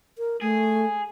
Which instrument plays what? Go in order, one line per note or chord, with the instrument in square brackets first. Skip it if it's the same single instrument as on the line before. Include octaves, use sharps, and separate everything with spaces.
[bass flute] A#4
[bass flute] A3 [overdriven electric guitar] G#4